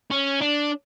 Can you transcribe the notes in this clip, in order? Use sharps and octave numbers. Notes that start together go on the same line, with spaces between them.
C#4
D4